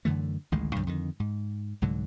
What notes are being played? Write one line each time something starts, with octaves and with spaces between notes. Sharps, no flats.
F#2 D3 E3 A3
A1 D2 D#3 G#3
C2 G2 D#3 F#3
F2 D3 D#3
G#2
C2 G#2 D3 F#3